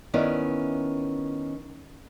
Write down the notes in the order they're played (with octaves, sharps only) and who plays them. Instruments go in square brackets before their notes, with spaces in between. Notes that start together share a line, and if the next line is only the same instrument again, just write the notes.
[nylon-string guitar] D#3 B3 C#4 E4 D5